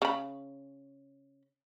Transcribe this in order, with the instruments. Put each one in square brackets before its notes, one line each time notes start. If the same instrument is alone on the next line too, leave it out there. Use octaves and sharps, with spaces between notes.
[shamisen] C#3 B5